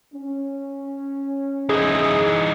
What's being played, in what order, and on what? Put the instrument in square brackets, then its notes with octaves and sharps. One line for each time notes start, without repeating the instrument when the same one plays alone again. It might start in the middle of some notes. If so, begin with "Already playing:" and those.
[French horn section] C#4
[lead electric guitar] E3 D#4 [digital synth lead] G#4